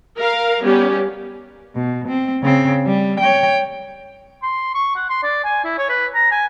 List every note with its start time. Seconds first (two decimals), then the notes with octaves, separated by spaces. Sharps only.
0.17 A#4 F5
0.63 G3 B3 C#4 G4
1.76 B2
2.08 C4
2.43 C#3 C4
2.86 G3
3.20 C#5 G5
4.43 C6
4.74 C#6
4.95 F#5
5.09 C6
5.23 D5
5.45 G#5
5.64 E4
5.78 C#5
5.89 B4
6.15 A#5
6.32 G#5